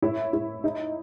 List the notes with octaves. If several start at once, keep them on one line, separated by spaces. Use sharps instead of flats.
E4 C#5 E5
E4
D#4